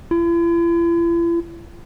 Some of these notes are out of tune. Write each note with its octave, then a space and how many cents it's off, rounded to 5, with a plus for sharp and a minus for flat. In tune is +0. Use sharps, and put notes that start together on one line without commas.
E4 +45